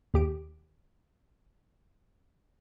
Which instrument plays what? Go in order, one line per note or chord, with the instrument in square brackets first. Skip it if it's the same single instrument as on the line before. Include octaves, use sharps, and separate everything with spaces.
[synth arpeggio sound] D#2 G4 D7